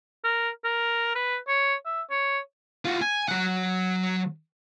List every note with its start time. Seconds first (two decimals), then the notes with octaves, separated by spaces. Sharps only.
0.24 A#4
0.65 A#4
1.15 B4
1.48 C#5
1.85 E5
2.11 C#5
2.85 F4 F#4
3.01 G#5
3.28 F#3 F#5